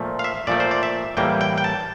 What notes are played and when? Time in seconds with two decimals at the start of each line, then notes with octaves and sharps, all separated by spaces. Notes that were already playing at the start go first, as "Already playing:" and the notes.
Already playing: A#2 F3 A3
0.19 F5
0.24 E5
0.47 A#2 F3 A3 D5
0.60 C5
0.71 D5
0.83 E5
1.17 A2 E3 G3 A#3 G5
1.41 G5
1.58 G5
1.64 A5